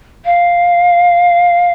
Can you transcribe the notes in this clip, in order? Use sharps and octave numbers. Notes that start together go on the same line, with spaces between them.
F5